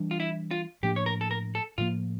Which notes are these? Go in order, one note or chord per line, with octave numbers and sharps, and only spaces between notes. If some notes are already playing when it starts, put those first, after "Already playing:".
Already playing: E3 G3 D4
F4
E4
F4
A2 F3 A#3 D4 G4
C#5
A#4
A4
A#4
A4
A2 F3 A#3 F4